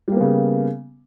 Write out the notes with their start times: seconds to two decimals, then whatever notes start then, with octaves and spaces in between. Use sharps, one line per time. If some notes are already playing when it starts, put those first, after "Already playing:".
0.08 G3
0.12 A#3
0.16 B3
0.21 C#3